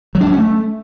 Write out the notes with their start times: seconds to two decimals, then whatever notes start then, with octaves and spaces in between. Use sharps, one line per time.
0.15 F#3
0.21 D4
0.27 F#3
0.32 C#4
0.38 A3